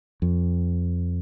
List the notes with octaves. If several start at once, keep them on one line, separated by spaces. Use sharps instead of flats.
F2